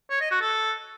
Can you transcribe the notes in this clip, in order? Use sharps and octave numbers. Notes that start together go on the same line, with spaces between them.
C#5
D#5
F#4
A4